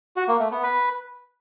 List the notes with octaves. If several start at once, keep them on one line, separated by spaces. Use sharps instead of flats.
F#4
A#3
A3
B3
B4